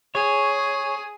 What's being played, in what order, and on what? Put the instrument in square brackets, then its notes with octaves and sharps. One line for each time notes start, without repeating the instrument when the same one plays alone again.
[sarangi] G#4 [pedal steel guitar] C#5